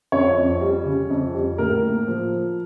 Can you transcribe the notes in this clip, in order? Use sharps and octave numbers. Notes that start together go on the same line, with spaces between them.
F2 C#5
F2
G3
C#3
F2
G3
A2 A#4
A#3
F3